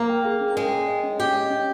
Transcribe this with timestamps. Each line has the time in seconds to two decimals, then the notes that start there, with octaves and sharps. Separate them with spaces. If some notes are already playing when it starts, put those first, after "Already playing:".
Already playing: A#3
0.09 G5
0.25 G#4
0.41 C#4
0.56 G#3 G5
0.71 G#4
0.88 D#5
1.04 C#4
1.18 G4 G5
1.34 D#5
1.50 C#4